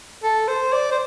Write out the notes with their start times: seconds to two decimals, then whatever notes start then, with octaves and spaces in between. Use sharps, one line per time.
0.23 A4
0.48 C5
0.73 D5
0.92 C5